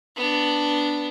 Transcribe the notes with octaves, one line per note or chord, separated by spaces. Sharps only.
B3 D4